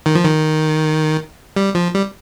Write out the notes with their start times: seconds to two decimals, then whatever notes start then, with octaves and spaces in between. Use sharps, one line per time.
0.06 D#3
0.15 F3
0.25 D#3
1.56 G3
1.75 F3
1.95 G3